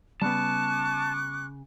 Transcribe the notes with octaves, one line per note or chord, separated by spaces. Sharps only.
C#3 G3 B3 A5 C#6 D6 F#6